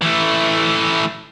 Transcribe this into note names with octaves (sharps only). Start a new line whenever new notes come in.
E3 A3